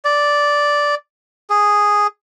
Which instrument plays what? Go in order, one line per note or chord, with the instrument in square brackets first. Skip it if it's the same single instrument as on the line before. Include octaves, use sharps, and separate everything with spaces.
[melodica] D5
G#4